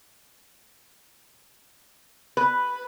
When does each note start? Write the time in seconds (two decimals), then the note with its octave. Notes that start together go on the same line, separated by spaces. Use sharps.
2.37 B4